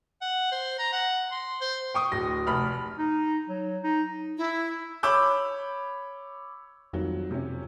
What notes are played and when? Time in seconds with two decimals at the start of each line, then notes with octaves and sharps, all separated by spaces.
0.22 F#5
0.52 C5
0.79 A#5
0.93 F#5
1.31 C6
1.62 C5
1.94 G5 C#6 D#6
2.12 D1 A#6
2.47 F1 B5 F6
2.98 D#4
3.48 F#3
3.83 D#4
4.38 E4
5.03 C#5 B5 D6 E6 G6
6.93 F2 D#3 F#3 G3
7.31 C3 C#4